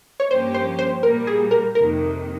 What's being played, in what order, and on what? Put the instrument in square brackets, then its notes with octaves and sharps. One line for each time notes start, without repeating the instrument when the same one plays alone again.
[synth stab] C#5
[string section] G2 F3 A#3 C#4 G4 [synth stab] C5
[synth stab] C5
C5
[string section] A#2 G3 A#3 [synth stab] A#4
[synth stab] G#4
A#4
[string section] F2 C3 D#3 A#3 [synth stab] A#4